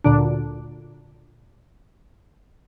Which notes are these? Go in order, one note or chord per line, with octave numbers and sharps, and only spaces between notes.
D2 A#2 D3 D4